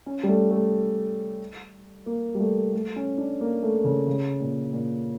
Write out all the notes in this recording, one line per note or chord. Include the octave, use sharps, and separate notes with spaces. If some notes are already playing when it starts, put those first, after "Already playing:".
C#4
G3
A3
A3
A#3
G3
A3
A3
C#4
D4
A#3
A3
C#3
C#3
A#2
A#2